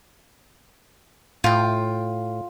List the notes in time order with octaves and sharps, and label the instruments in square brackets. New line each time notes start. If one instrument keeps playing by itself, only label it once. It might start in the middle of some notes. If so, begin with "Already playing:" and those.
[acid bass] A2 [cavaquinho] F4 G5